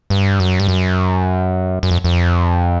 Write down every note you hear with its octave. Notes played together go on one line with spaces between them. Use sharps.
G2
F#2
G2
F#2
F#2
F2
F2